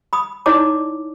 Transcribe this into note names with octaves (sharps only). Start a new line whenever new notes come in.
B5 D#6
D#4 E4 C#5 D5 A5 D6